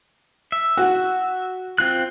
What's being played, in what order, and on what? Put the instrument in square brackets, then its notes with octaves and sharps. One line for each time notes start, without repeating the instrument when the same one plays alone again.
[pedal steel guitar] E5
[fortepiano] F#4
[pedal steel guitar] C4 F4 F#6